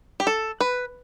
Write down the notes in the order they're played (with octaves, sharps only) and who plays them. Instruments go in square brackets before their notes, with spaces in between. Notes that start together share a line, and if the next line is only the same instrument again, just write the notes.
[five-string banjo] G4
A4
B4